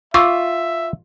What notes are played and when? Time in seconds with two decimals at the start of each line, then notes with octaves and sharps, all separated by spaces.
0.14 F4 E5 C#6 D6 E6